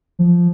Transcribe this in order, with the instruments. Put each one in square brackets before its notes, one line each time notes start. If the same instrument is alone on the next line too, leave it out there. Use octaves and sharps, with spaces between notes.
[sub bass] F3